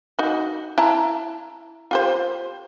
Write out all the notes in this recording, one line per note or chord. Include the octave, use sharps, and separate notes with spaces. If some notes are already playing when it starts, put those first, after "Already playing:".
D#4 F#4
E4 A5 A#5
F4 G4 C5